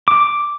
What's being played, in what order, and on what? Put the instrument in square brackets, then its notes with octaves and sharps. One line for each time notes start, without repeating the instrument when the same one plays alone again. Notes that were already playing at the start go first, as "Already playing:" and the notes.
[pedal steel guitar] D6